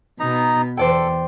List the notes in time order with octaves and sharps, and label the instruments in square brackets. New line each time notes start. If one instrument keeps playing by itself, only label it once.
[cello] B2 B3 [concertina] D#4 A#5
[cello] E2 [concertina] A4 [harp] C5 D5 G5